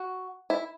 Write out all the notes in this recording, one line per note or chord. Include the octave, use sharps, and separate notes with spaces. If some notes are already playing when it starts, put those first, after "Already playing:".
Already playing: F#4
E4